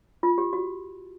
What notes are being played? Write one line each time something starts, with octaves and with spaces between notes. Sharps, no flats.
F4
G4
F#4